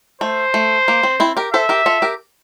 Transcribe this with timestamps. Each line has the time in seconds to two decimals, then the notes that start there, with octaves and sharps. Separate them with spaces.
0.21 A3 C5
0.54 A3
0.88 A#3
1.03 C4
1.20 C4 E4
1.37 G4 A#4
1.53 A4 C5 E5
1.69 G4 A#4
1.86 F4 A4
2.02 G4 A#4